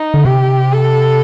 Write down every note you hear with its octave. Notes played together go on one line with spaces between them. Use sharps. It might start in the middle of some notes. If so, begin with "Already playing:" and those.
Already playing: D#4
D3
C3 G4
A4